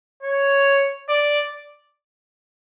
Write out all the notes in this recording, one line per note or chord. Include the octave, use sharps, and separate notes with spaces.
C#5
D5